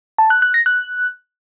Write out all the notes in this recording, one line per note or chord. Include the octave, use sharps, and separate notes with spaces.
A5
F#6
F#6
A#6
F#6